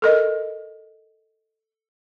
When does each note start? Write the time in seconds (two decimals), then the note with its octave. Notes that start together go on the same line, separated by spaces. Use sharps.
0.02 A4 A#4 D#5